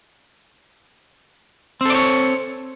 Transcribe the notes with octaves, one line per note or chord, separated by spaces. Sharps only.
C4 A4 C#5 D5